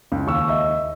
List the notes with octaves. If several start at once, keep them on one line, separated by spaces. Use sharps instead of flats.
C#2
D#2 C#6 E6
D#5 E5